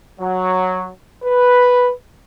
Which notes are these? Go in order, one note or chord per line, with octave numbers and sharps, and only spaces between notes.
F#3
B4